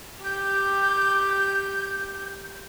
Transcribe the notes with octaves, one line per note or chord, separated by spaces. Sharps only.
G4 G6